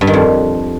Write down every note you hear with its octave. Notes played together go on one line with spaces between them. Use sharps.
G2
D#3
F2